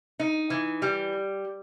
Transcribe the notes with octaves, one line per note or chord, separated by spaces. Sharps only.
D#4
E3
G3